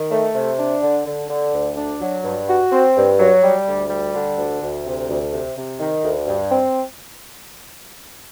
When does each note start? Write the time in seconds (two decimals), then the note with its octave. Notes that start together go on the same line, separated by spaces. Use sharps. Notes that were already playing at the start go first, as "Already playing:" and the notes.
Already playing: D#3
0.11 A3
0.35 C3
0.59 D4
0.82 D3
1.06 D3
1.29 D3
1.53 D2
1.77 D4
2.01 F#3
2.24 G2
2.49 F#4
2.72 C4
2.96 G2
3.20 F#3
3.43 G3
3.67 D2
3.90 G3
4.15 D3
4.38 D2
4.62 D2
4.86 C3
5.09 D2
5.33 C3
5.57 C3
5.80 D#3
6.04 D2
6.28 G2
6.51 C4